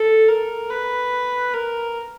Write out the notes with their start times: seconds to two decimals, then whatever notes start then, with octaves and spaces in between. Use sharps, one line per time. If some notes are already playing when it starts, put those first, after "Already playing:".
Already playing: A4
0.28 A#4
0.70 B4
1.54 A#4